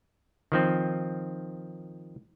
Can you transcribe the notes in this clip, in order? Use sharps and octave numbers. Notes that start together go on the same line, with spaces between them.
D#3 F3 C4